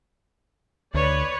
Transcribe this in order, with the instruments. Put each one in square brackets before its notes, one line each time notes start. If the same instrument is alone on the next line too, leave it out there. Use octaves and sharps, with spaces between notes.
[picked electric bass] D2 [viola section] B4 C#5 D5